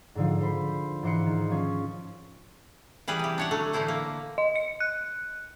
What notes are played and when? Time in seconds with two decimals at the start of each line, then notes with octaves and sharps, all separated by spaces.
0.15 G#2 D3 F3
0.39 D3 C5 B5
1.03 G#2 E3 C5 F#6 C#7
1.26 D#3
1.50 F3 C#4
3.07 E3 G3 G#4 B4
3.19 C3 G4
3.38 D4 C#5 F#5
3.51 D3 F#3 A3
3.73 A2 D3 E3 E4 C5
3.88 A#3
4.38 D#5
4.56 C#7
4.80 F#6